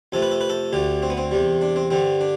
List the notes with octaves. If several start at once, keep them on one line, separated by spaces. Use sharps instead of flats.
F2 C3 F3 A3 A4
B4
A4
B4
A4
D2 D3 A3 G4
C4
B3
C4
E2 C3 G3
D4
C4
G2 D3 G3 C4
D4